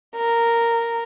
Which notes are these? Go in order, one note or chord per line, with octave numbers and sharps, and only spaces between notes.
A#4